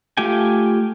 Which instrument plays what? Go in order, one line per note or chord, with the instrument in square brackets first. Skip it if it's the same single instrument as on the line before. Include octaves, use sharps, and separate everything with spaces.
[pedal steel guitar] A3 F4 G4 G5 G#5